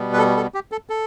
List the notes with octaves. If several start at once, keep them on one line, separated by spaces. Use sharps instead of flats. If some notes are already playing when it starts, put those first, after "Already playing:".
Already playing: B2 G3 B3
B4
A4
A4
G4
A4
A4